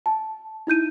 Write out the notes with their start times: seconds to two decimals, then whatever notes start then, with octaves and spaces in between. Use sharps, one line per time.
0.06 A5
0.67 D#4 E4 G6 D#7